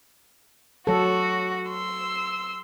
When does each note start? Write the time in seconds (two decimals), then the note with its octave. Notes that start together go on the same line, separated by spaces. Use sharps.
0.87 F#3 F#4 A4
1.69 C6 E6